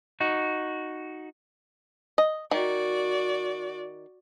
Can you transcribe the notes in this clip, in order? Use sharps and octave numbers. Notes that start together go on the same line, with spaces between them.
D#4 F#4
D#5
D#3 F#4 D5